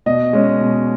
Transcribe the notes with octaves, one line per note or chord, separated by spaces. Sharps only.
B2 D#5
G#3 C#4
B2